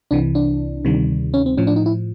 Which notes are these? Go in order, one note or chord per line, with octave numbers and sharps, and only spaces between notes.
C2 C3 E3 D4
D4
D2 C3 D#3 G3
C#4
C4
A2 F3 C#4
D4
D#4
E4